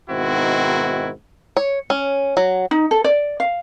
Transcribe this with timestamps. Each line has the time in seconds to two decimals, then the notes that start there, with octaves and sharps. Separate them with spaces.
0.10 G#2 B2 D#3 C4 E4 F#4
1.57 C#5
1.90 C#4
2.37 F#3
2.71 D#4
2.91 A4
3.04 D5
3.40 F5